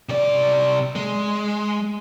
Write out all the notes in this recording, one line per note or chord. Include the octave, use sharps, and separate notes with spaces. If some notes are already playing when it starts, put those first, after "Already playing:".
C3 D5
G#3